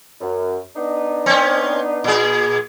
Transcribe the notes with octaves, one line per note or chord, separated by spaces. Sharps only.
F#2
B3 D4 D#4
C4 C#4
A#2 G#4